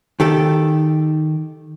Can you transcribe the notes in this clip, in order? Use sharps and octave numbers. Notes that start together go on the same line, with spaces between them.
D#3 G4 A4